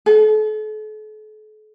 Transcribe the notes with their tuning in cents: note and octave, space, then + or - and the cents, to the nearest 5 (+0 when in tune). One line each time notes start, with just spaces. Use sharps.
A4 -40